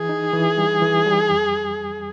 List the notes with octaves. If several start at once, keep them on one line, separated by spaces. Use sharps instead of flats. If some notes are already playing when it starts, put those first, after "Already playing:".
Already playing: E3 G#4
D#4
E3
G3
E3
G3
F2